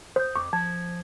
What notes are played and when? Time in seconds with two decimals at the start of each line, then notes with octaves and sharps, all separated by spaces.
0.16 C5 D#6 G6
0.36 F2 C#6 D6
0.53 F3 A5 G#6